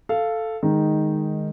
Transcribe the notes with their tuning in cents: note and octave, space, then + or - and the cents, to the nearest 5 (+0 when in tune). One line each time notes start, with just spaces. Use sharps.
A4 +0 F5 -10
D#3 -5 G#3 +0 D#4 +0